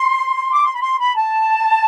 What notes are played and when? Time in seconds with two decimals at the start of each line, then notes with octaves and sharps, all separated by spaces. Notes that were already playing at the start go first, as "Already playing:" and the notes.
Already playing: C6
0.52 D6
0.62 C6
0.74 B5
0.80 C6
0.99 B5
1.16 A5